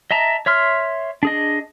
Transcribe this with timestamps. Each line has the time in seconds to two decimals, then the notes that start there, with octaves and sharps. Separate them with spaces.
0.11 D#5 E5 A5 A#5
0.46 C#5 E5 C6 F6
1.23 D4 G#4 D#5